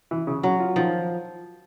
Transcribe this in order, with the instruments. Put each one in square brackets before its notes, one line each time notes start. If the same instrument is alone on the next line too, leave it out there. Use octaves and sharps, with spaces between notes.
[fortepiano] E3
C#3
[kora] F#3 [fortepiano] C#4
[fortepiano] F4
[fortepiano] D#3 [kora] F3